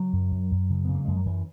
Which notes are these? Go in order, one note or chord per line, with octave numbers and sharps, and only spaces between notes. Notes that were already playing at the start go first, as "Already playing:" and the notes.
Already playing: C#3 F#3
F#2
F#2
F#2
C#3
C#3 B3
A#3
F#2 G#3
F#3
F#2 E3